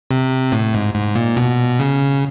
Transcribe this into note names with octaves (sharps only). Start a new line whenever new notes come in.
C3
A2
G#2
G#2
A#2
B2
C#3